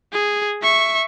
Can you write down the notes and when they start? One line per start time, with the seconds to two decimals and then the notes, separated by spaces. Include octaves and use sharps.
0.13 G#4
0.62 E5 C#6